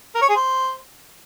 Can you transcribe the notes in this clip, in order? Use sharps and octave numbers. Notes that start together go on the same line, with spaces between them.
A#4
C#5
G#4
C5